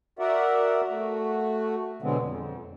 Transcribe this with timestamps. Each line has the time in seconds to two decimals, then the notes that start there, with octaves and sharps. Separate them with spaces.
0.19 F#4 A#4 D5 E5 F#5
0.89 A3 F#4
2.02 B2 D3 F#3 G#3 B3 C4
2.20 F2